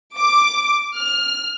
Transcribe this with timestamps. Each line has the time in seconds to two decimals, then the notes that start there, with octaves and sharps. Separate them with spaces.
0.17 D6
0.97 F6